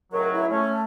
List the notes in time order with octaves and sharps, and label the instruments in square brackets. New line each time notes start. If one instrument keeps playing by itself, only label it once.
[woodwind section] C#2 A2 F#3 [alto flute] A#4
[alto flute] E4
[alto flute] A3 [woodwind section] C#4